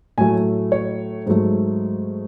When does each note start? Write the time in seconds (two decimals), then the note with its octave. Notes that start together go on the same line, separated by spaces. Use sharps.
0.18 A2 F#3 A3 G#5
0.72 C#5
1.26 G#2 F#3 A3